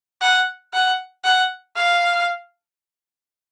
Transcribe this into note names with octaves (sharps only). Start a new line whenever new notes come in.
F#5
F#5
F#5
F5